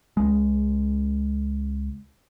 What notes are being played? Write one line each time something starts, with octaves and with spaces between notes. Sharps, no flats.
C#2 G#3